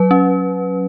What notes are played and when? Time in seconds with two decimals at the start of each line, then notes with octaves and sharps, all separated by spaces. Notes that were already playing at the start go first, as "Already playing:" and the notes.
Already playing: F#3 B4
0.11 C#4